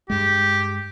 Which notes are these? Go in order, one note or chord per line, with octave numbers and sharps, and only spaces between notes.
G2 G#3 G4